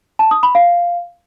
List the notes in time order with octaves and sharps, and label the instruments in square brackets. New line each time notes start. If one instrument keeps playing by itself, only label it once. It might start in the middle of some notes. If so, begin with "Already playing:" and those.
[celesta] A5
D#6
B5
F5